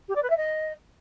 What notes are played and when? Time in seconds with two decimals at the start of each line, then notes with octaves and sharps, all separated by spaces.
0.08 G4
0.15 D5
0.23 B4
0.30 E5
0.37 D#5